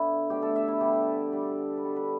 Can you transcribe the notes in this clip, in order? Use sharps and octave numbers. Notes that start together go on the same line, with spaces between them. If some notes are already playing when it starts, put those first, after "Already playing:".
Already playing: D3 B3 D4 E4
B2 A3 D4 G4
A4
E5
E4
D3 G3 B3 G4
D3 G3 D4
B4
B2 G3 B3 D4 A4
B4